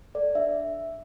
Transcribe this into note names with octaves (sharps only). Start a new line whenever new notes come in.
A4 D5
D4 E5